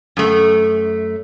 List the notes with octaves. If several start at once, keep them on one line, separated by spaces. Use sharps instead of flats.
F#2 A3